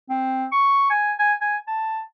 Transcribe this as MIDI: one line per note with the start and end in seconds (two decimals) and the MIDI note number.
0.10 0.45 60
0.52 0.89 85
0.90 1.13 80
1.19 1.33 80
1.41 1.57 80
1.67 2.00 81